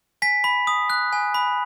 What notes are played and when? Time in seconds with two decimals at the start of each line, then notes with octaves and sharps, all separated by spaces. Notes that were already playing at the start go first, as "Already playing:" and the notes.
0.22 G#5 B6
0.44 B5
0.67 D#6
0.90 F#6
1.13 G#5
1.34 B5